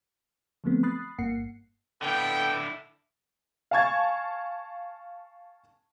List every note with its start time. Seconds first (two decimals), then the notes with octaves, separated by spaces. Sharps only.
0.64 D3 F3 F#3 A3 B3 C4
0.83 B5 D#6 F#6 A6 C7
1.19 G1 G2 A#3 F#5 C7 C#7
2.02 D3 B3 E4 A4 G5
3.71 F5 G#5 A5 C#6 G#6 A6